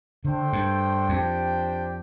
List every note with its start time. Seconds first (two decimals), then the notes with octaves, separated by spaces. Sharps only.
0.25 D3 A3 D4 A4 C5 G5
0.53 G2
1.09 F2 D4 G4 C5 G5